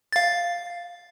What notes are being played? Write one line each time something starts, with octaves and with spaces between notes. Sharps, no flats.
F5 A6